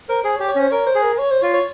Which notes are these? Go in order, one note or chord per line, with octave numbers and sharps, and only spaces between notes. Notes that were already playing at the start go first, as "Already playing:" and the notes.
A#4 C5
G#4 C5
C#5
G4
C#5
C#4 C5
A#4 C#5
C5
G#4
A#4
C#5
C5
F4 C#5
C#5